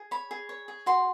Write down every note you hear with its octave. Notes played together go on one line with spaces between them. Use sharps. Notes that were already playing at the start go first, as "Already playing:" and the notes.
Already playing: G#4
C#5 B5
G#4
C#5
G#4
F#4 C6